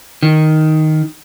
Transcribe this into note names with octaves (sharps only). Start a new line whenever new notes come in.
D#3